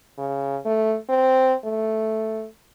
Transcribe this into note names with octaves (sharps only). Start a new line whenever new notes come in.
C#3
A3
C4
A3